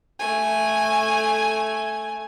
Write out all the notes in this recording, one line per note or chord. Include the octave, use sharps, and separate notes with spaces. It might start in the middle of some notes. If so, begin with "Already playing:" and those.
A3 G#5